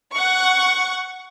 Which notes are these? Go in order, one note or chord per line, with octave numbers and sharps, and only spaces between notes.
F#5 C#6